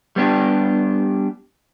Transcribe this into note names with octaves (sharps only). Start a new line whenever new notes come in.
G3 B3 D4 G4